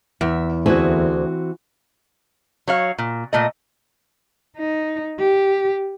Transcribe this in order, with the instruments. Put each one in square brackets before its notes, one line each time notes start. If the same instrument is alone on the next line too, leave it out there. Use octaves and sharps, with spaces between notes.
[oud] E2 [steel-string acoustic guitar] E5
[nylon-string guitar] D2 E4 G#4 [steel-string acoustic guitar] E3 C4 F#4
[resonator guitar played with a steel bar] F#3 C#5 F5
A#2
A#2 A3 D#5
[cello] D#4
G4